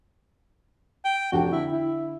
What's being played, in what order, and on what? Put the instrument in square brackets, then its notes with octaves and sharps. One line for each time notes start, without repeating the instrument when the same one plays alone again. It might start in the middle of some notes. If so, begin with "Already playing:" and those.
[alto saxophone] G5
[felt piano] F1 D4 G5 [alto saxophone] F#4
[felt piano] D3 [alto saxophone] E4
[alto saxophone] E4